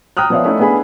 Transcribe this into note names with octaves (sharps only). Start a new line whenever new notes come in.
G5 A#5 D#6 F6 F#6
F3 B3 C#5 D5 E5 F5
A3 C#4 D#4 E4
B3 D4 G#4 G#5 B5